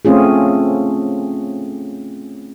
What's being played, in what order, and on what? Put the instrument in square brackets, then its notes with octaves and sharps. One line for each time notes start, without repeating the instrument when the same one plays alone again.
[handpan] A3 C4 C#4 F4 G#4